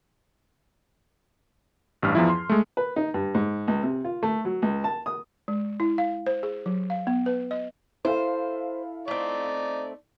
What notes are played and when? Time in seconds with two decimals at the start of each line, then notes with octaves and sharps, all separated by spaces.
2.02 A1 G2 F6
2.15 E2 F3 E4
2.30 C6
2.49 G#3 A3
2.77 B4
2.96 D#4
3.14 G2
3.35 G#2
3.68 C#2
3.83 C3
4.04 F4
4.23 A3
4.45 F#3
4.62 C#2
4.84 A5
5.06 D#6
5.48 G#3
5.80 E4
5.98 F5
6.26 C5
6.43 G#4
6.66 F#3
6.90 F5
7.07 B3
7.26 B4
7.51 D#5
8.05 E4 A4 C5 F5
9.08 A3 C4 D#4 D5